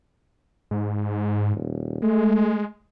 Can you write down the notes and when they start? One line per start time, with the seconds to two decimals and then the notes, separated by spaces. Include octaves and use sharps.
0.71 G#2
1.54 D#1
2.02 G#3 A3